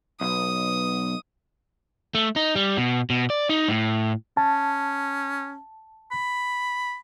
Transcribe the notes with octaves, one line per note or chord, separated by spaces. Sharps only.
B1 D#6
A3
D#4
G3
B2
B2
D5
D#4
A2
C#4 A5
B5